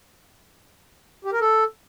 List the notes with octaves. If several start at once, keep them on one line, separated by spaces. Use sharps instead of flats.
G4
A#4
A4